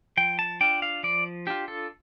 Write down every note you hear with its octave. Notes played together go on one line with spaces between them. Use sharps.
F3 G5
A5
D4 F4 G5
F5
F3 D5
D4 F4 G4
A4